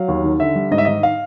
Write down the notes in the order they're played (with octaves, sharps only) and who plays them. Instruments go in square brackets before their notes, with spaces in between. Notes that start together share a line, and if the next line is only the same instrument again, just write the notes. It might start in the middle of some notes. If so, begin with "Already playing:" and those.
Already playing: [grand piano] F#3 F5
D#2
D#3
D3 E5
G3
G#2 D#5
E5
D#3 D#5
F5